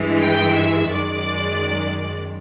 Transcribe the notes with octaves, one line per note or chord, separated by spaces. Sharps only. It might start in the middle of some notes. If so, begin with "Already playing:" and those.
Already playing: G2 E3 G#3
G5
E5
F#2 D#3 G#3 D5